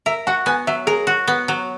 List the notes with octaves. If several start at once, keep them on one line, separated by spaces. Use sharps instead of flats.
A#4 E5
F#4 F#5
B3 G#5
F#3 E5
G#4 A#4
F#4
B3
F#3